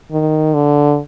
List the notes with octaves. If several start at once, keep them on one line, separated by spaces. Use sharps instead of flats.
D#3
D3